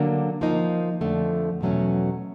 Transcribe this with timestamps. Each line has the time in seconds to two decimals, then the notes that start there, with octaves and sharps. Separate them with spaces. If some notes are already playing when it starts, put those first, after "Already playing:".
Already playing: D3 F#3 A#3 D4
0.41 F3 A#3 D#4
1.01 F2 D3 F3 A3
1.61 E2 B2 F#3 A3 C#4